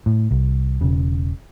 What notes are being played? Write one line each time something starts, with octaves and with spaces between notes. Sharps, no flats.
A2
C2
E1 C#3